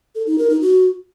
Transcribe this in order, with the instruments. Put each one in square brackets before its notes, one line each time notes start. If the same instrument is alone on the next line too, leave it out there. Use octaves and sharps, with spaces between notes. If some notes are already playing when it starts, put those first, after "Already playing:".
[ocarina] A4
D#4
A#4
D#4
F#4